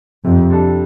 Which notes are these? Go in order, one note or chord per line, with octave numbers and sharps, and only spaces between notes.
F2 C3
G3 D4 A4